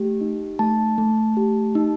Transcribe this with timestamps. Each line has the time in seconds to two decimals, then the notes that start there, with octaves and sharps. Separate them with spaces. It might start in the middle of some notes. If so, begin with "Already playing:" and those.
Already playing: A3 G4
0.21 D#4
0.59 A3 A5
0.98 A3
1.37 G4
1.75 D#4